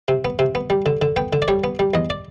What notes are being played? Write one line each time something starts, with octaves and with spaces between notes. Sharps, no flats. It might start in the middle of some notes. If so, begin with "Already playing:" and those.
C3
B3
C3
B3
G3
D3
D3
B3 G5
D3
D5
G3 C#5
B3
G3
E2 D#5
D5